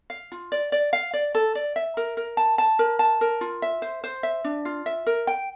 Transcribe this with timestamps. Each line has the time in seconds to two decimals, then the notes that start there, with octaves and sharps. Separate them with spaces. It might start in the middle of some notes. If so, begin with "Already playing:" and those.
0.10 F5
0.32 F4
0.52 D5
0.72 D5
0.93 F5
1.13 D5
1.35 A4
1.55 D5
1.76 E5
1.97 A#4
2.17 A#4
2.37 A5
2.58 A5
2.79 A#4
2.99 A5
3.21 A#4
3.41 F4
3.62 E5
3.82 C5
4.04 C5
4.23 E5
4.44 D4
4.65 F4
4.86 E5
5.07 A#4
5.27 G5